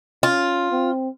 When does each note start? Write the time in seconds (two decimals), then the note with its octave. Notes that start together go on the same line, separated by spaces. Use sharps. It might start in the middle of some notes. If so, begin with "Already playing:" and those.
0.23 C#4 F4
0.71 C4